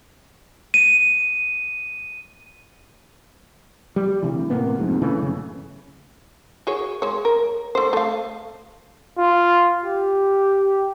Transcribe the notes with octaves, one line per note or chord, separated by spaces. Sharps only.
D#7
G3
D2 C3 E3
A2 C3 A#3 B3
C2 F2 G#2
A#2 C#3 E3 A3
F#2 C#3
F#4 G#4 C#5
G#3 C#5
A#4
A3 C5
A3 F5
F4
G4